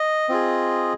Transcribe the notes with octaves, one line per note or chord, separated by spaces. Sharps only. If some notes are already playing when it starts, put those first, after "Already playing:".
Already playing: D#5
C4 F4 G#4